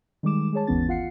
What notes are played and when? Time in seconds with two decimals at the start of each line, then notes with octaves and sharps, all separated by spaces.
0.23 D#3 G3 G#3 D6 E7
0.53 G#3 G#4 C#5 A5
0.67 G1 D#2 E3 B3 C#4 A6
0.88 G#1 F4 F5 F#5 C7 C#7